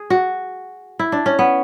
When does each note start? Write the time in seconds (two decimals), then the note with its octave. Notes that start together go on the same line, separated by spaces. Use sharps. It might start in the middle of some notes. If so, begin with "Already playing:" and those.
Already playing: G#4
0.10 F#4
0.99 E4
1.12 D4
1.26 C#4
1.39 B3